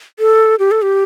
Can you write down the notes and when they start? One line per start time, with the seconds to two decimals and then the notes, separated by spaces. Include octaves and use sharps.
0.19 A4
0.59 G4
0.71 A4
0.82 G4